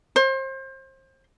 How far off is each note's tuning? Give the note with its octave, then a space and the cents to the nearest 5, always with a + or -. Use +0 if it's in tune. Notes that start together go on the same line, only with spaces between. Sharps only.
C5 +30